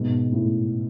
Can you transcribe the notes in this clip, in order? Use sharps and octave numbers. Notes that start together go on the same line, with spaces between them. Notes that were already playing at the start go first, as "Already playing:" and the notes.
Already playing: G#2 B2
A2